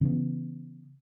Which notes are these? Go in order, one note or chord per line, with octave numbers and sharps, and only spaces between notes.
C#3 E3 B3